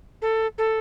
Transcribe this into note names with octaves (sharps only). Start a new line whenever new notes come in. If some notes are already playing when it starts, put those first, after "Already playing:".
A4
A4